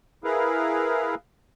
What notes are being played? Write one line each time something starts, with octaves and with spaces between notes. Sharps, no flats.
E4 G#4 A#4 B4 F5